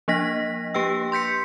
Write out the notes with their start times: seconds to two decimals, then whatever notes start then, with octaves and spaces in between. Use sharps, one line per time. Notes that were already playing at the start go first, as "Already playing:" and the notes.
0.08 F3 A#3 D4 D#5 A#6 B6
0.74 A#3 G4 B4 G5 E6
1.12 C6 G6 B6 C#7